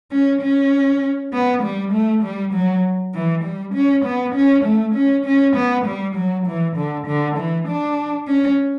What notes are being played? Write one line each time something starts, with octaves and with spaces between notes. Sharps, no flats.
C#4
C#4
B3
G3
A3
G3
F#3
E3
G3
C#4
B3
C#4
A3
C#4
C#4
B3
G3
F#3
E3
D3
D3
E3
D4
C#4